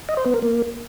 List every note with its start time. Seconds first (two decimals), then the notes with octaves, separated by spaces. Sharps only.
0.09 D#5
0.17 C5
0.26 B3
0.34 A#4
0.42 A#3